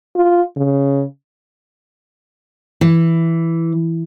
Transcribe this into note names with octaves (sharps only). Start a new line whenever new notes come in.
F4
C#3
E3